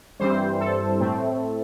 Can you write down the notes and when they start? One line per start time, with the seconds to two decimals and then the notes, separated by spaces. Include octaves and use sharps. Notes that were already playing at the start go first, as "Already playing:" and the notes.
0.20 G2 E3 G3 C4 C5
0.60 A4
1.00 A2 A3 C4